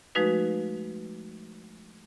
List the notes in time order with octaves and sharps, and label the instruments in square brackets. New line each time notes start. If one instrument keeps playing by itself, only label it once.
[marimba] F3 G#3 A3 D#4 F#4 B4